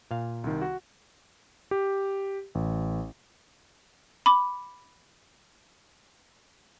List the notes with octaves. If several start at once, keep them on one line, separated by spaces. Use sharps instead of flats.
A#2 F5
C2 D#3
F#4
G4
A1
B5 D6